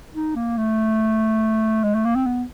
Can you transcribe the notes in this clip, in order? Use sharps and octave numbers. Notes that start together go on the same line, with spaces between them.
D#4
A#3
A3
G#3
A3
A#3
C4
B3